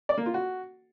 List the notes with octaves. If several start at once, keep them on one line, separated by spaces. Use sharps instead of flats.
D5
A#3
F4
F#4